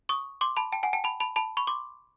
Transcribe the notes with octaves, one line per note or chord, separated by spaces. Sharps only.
C#6 D#6
C6 D6
A5 B5
G5 A5
F#5 G#5
G5 A5
A5 B5
A5 B5
A5 B5
B5 C#6
C6 D6